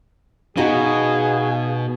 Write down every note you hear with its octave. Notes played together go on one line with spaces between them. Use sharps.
B2 B3 D#4 F#4 G#4 F5